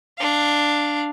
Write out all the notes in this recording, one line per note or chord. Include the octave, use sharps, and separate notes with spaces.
D4 F5